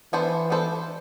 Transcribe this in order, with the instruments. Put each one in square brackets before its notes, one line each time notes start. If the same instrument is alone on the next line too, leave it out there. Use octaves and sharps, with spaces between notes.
[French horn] E3 [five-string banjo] B3 D4 A4 C5
[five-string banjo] B3 D4 A4 C5